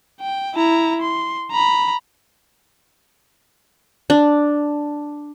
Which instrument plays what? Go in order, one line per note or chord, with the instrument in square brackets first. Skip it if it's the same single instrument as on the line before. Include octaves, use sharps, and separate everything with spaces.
[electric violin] G5
E4 A#5
C6
A#5 B5
[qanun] D4